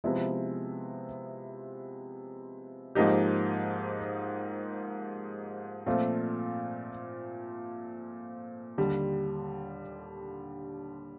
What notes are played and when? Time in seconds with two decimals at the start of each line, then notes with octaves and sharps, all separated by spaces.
0.04 C3 F3 G#3 B3 E4
2.95 G#2 F3 A#3 D#4 G4
5.87 A#2 F3 A3 C4 F4
8.78 D#2 D3 G3